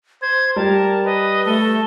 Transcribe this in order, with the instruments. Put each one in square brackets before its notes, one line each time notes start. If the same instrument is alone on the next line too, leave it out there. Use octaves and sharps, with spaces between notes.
[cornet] C5 [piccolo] G#6
[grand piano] G3 [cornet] A#4 [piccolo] A5
[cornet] B4 [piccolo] D#5
[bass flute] A3 [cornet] A4 [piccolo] G7